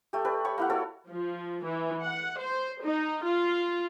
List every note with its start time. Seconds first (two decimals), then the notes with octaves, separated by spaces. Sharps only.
0.13 A3 G4
0.25 G4 B4 D5
0.45 C#5 B5 C#6
0.58 A#3 E4 F#5
0.70 F#4 A4 C#5 D5
1.09 F3
1.64 E3
2.01 F#5
2.38 C5
2.82 D#4
3.24 F4